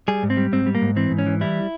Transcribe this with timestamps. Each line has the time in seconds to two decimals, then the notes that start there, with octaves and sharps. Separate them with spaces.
0.08 G3 G#4
0.23 G#2
0.30 C4
0.37 G3
0.52 G#2 C4
0.66 G3
0.75 A#3
0.82 G#2
0.96 E3 C4
1.11 G#2
1.18 C#4
1.27 E3
1.41 G3 E4